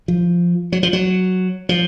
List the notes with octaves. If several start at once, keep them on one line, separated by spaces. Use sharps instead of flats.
F3
F#3
F3
F#3
F3